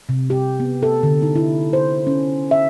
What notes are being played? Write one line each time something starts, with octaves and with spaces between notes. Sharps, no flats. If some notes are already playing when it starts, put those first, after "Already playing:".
C3
G4
B3
A4
D3
D#4
E4
C5
C#4
E5